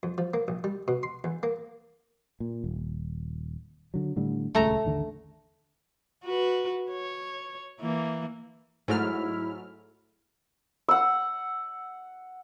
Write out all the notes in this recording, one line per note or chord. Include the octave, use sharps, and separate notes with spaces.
F2
F3
A#3
A#1
G3
B2
C6
E2
A#3
A#2
D#1
D3 F#3
A2 D3 G3
D#1 C#2 G#3 A3 A#5
A1 D#2 D3
F#4 B4
C#5
E3 A#3
G#2 F#3 A3 E4 G#4 F6
F#5 E6